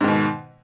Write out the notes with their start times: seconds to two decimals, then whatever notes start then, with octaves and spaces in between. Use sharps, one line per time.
0.01 G#2
0.04 D#3
0.08 B2